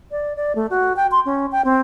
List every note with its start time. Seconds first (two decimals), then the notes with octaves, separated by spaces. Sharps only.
0.11 D5
0.36 D5
0.55 A3
0.70 F#4
0.96 G5
1.11 C6
1.25 C#4
1.52 G5
1.65 C4